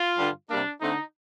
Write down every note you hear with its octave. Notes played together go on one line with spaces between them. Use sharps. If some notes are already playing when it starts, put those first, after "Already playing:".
Already playing: F4
G2 D3 G3
C3 G3 A#3 D4
D3 A3 C4 D#4